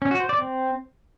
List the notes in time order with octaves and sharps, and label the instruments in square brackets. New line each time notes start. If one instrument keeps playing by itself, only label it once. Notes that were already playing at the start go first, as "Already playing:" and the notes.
[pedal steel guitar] C#4
F#4
C5
D5
C4